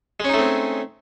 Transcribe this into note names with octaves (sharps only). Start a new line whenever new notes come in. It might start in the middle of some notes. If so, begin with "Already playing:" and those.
G#3 A3 C4 C#4 D#4